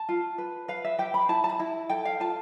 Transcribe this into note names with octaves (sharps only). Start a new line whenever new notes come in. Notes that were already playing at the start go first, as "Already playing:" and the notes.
Already playing: A5
F4
B4
B4 F5
E5
G4 G5
B5
E4 A5
A5
B5
E4
A4 G5
F5
F4 A5